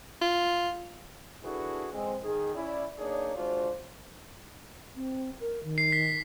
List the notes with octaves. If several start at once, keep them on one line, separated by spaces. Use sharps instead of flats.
F4
D4 E4 F#4 G#4 A4 B4
G#3 C4
D#3 G#4
C#4 E4 D5
A#3 D4 D#4 G#4 C#5 D5
G#3 D4 F4 F#4 C5
C4
A#4
D#3
C7
B6